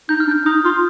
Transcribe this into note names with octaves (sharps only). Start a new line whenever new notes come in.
D#4 G6
F6
D4
G6
D#4 D#6
F4 F6